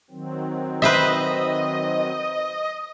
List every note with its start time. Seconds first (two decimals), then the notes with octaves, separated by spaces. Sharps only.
0.10 D#3 F#3 C4
0.82 B4 C5 D#5 E5